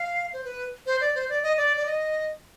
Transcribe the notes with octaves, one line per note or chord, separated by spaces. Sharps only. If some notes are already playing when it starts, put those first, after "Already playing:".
Already playing: F5
C5
B4
C5
D5
C5
D5
D#5
D5
D5
D#5